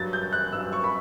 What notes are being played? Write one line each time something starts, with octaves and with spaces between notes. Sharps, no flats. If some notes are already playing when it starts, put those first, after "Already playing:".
Already playing: G2 F#3 A6
G6
F#6
G2 F#3 E6
C#6
B5